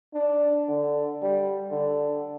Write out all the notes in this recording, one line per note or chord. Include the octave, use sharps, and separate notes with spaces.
D4
D3
G3
D3